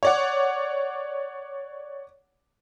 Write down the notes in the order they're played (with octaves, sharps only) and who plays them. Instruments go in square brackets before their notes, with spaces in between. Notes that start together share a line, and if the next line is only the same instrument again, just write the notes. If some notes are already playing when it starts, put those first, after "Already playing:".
[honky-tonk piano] C#5 D5 F#5